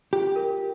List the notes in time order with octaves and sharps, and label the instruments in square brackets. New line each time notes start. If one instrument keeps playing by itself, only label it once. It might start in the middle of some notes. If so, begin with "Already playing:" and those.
[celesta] F4 [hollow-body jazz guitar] G4
[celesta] A#4